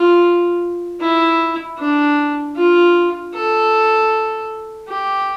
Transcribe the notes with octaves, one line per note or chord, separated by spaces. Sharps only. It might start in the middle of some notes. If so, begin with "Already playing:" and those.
Already playing: F4
E4
D4
F4
A4
G4